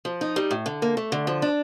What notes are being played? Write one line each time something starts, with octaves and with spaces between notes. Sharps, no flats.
F3
D#4
G3
A2
D3
A#3
A3
D3
F3
D4